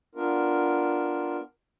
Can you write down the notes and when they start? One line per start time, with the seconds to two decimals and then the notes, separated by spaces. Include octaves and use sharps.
0.15 B3 D4 F4 A#4